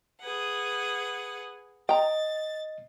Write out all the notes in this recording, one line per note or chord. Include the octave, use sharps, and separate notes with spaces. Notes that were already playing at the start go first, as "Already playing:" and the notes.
G#4 B4 F#5
D#5 G5 A#5 A6